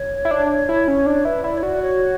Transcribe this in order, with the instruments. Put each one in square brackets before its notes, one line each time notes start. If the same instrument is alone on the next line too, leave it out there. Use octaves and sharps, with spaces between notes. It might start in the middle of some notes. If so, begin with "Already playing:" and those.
Already playing: [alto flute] C#5
[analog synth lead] E4
D4
E4
C#4
D4
[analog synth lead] E4 [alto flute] B4
[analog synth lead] E4 [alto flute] D5
[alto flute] C#5
[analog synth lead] F#4 [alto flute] D5
[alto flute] C#5